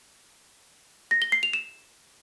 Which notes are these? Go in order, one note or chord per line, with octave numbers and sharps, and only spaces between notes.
A#6
G7
C7
F7
E7